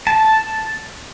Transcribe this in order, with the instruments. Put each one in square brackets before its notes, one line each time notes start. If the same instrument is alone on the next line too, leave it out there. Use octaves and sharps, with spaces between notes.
[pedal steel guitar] A5